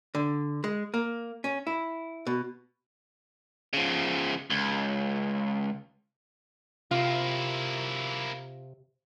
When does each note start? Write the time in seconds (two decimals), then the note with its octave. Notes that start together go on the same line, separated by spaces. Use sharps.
0.15 D3
0.64 G#3
0.94 A#3
1.44 C#4
1.67 E4
2.27 B2
3.73 C#3 F3
4.50 C#2
6.91 C3 A#3 E4 F4